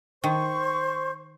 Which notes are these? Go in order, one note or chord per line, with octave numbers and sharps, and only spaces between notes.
D#3 C5 C#6